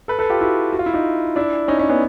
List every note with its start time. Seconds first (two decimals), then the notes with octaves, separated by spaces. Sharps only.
0.08 A4 B4
0.19 A4 B4
0.30 F4 G4
0.41 E4 F#4
0.73 F#4
0.79 F4
0.86 E4
0.94 D#4 F4
1.36 D4 E4
1.68 C#4 D#4
1.79 C#4 D#4
1.89 B3 C#4